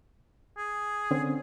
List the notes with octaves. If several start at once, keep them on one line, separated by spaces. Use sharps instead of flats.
G#4
D3 C4 C#4